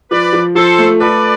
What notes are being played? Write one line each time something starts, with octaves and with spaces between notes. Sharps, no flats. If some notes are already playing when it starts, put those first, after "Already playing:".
F3 B4 D5
F3
F3 A4 C5
A3
A4 B4 D5